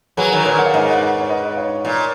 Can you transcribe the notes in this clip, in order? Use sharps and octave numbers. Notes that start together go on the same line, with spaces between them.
F#3 A#3 G#4 B4
D#3 F#3
A#2 A#4 C#5
F#5
F5
G#2 B4 D#5
C#5
B4 D#5
C#5 F5
A#2